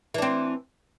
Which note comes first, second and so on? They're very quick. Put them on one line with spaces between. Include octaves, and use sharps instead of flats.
E3 D4 C4